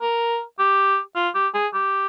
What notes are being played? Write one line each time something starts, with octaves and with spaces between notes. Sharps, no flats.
A#4
G4
F4
G4
G#4
G4